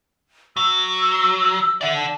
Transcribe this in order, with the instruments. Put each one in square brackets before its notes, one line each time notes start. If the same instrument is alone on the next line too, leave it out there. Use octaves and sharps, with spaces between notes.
[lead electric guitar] F#3 [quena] E6
[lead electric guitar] D5 F#5 [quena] E5
[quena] A5